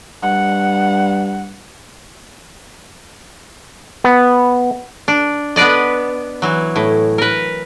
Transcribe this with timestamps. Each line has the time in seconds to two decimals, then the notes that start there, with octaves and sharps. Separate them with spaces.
0.23 G2 F#5
4.04 B3
5.08 D4
5.56 B3 D4 B4 D5 D#5
6.42 E3 F#3
6.76 A2
7.18 A#4 B4